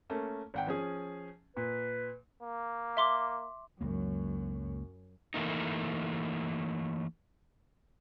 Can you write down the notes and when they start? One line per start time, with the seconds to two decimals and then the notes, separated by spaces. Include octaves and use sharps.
0.10 A3 A#3 C#4
0.54 G#1 F#5 G5
0.67 F3 C#4 G#4
1.57 A#2 B4
2.43 A#3
2.97 E5 C6 D6
3.81 C#2 F#2 F#3 A#3
5.34 E3 A3 A#3 D#4